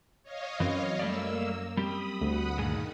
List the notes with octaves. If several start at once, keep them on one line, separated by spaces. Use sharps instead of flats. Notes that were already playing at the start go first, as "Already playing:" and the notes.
C#5 D#5 F5
F#2 E3 C4
G3 A3 A#3 D5 E6
G3 C4 G4 B5 D#6
D2 F#5 B5 D#6
G2 A#2 D#3 G#4